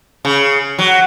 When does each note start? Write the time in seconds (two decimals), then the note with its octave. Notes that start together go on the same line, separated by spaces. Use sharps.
0.25 C#3
0.79 F#3